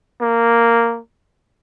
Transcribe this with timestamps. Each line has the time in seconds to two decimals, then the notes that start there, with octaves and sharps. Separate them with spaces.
0.22 A#3